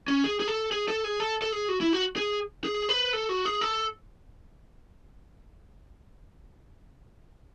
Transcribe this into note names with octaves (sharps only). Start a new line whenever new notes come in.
C#4
G#4
G#4
A4
G#4
A4
G#4
A4
A4
G#4
F#4
E4
F#4
G#4
G#4
B4
A4
F#4
G#4
A4